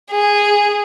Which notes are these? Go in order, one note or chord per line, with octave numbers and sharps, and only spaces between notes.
G#4